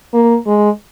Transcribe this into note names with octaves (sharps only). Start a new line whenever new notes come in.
A#3
G#3